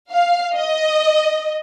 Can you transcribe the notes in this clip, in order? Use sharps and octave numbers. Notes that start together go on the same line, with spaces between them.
F5
D#5